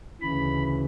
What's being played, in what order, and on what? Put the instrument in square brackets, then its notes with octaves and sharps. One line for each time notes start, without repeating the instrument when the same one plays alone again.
[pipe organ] D2 C#3 E3 B5